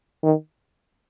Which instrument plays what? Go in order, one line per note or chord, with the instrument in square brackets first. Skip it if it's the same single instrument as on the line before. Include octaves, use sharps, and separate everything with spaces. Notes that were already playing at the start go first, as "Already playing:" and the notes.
[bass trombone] D#3